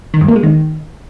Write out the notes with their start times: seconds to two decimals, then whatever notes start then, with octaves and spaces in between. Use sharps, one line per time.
0.14 D#3
0.21 G2
0.28 A#3
0.36 G#3
0.43 D#3